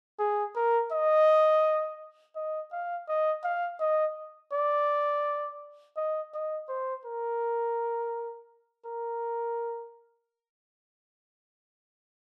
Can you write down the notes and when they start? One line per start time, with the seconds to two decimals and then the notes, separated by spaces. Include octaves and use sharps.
0.19 G#4
0.56 A#4
0.92 D#5
2.36 D#5
2.72 F5
3.08 D#5
3.44 F5
3.80 D#5
4.53 D5
5.97 D#5
6.34 D#5
6.69 C5
7.05 A#4
8.85 A#4